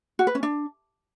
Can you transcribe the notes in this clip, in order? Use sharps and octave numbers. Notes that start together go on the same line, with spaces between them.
F#4
B4
C#4
D4